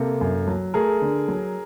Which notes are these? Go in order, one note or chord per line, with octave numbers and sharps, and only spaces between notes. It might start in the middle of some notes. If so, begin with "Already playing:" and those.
Already playing: C3 A#3 A4
F#2
F#3
A3 G#4 A#4
D3
F#3